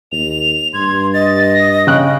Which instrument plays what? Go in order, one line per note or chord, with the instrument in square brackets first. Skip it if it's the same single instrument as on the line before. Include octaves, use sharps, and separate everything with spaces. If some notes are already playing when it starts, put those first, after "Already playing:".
[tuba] D#2 [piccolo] F7
[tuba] G2 [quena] C6 [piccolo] G#6
[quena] D#5 [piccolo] A6
[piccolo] A#6
[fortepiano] C#3 F#6 [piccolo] G5